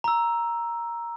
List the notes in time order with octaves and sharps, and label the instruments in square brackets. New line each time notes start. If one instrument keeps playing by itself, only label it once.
[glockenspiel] A#5 E6